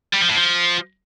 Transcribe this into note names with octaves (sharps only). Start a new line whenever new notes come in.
G3
F3
A2
F3